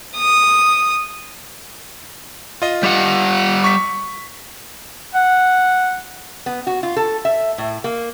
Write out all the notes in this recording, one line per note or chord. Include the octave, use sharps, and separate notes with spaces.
D#6
F4 D#5
G3 G4 F#5
C#6 B6
F#5
B3
F#4
F4
A4
E5
A2
A#3